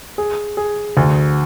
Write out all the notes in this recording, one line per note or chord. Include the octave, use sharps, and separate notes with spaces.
G#4
G#4
D2